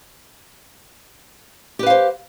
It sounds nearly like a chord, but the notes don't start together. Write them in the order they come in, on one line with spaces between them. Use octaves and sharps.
G4 B4 F5 C5